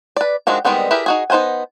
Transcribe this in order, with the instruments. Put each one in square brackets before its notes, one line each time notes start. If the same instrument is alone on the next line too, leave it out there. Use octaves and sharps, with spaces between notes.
[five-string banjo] B4 D5
D#3 F3 G#3 D4 F#4
D#3 G3 G#3 B3 C4
E4 G4 G#4 A#4 B4
D#4 F#4 G#4
B3 D#4 C5 F#5 G#5